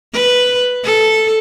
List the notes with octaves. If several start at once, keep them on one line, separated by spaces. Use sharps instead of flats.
B4
A4